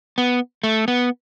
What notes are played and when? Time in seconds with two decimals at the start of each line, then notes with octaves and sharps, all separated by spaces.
0.18 B3
0.64 A3
0.88 B3